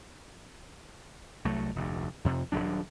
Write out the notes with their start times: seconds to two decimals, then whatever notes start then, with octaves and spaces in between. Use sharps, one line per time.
1.45 C2 F#3 A3
1.76 F1 D2
2.24 F2 C3
2.52 D#1 F#2 F#3 D4